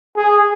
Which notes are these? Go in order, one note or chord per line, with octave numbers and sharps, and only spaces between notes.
G#4